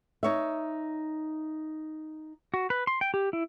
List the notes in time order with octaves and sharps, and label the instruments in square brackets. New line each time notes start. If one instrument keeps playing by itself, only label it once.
[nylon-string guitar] D#4 C#5 E5
[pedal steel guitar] F#4
B4
C6
G5
G4
E4